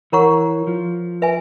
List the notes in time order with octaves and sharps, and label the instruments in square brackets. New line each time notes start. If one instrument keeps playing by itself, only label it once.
[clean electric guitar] E3 [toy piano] A#4 C#5 F#5 A#5 C#6
[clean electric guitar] F3
[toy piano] B4 E5 G#5